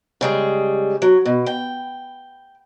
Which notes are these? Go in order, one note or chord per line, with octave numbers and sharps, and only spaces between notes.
C#3 G3 G#3
F#3
B2
G5